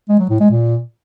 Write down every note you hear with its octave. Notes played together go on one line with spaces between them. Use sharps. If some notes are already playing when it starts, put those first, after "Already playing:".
G#3
F#3
A2
G#3
A#2